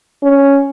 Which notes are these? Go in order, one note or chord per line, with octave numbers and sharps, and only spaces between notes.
C#4